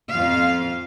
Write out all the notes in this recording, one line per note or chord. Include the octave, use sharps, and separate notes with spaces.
F2 F4 F5